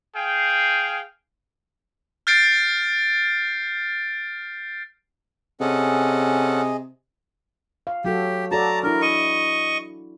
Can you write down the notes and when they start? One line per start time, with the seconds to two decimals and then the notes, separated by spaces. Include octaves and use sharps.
0.15 G#4 F5 G5
2.27 F6 G6 A6 C7 D7
5.61 C3 C#4 G#4 A4 D#5 F#5
7.87 F5
8.04 F#3 F#4 G4 A4
8.51 F#4 A4 D5 A5 A#5
8.83 D4 E4 A#4
9.02 D#5 C#6